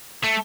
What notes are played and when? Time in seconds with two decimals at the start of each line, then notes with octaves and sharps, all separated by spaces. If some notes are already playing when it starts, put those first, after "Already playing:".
0.24 A3